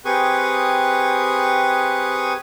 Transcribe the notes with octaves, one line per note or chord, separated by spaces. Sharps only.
C4 G4 G#4 B4 C#6 D#6